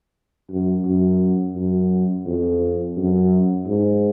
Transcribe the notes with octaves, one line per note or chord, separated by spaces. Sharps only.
F#2
F#2
F#2
F2
F#2
G#2